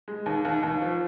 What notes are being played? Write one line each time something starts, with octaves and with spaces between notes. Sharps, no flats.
G#3
D#2
D#2
D#2
F3